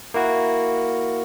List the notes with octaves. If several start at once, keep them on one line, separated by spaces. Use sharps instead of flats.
A#3 E4 F#4